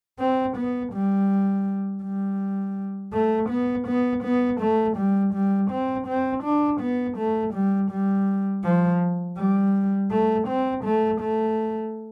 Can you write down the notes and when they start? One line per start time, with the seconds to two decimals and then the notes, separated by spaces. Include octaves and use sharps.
0.19 C4
0.57 B3
0.93 G3
2.04 G3
3.13 A3
3.50 B3
3.87 B3
4.24 B3
4.61 A3
4.97 G3
5.34 G3
5.71 C4
6.07 C4
6.44 D4
6.81 B3
7.17 A3
7.54 G3
7.91 G3
8.64 F3
9.38 G3
10.11 A3
10.48 C4
10.84 A3
11.21 A3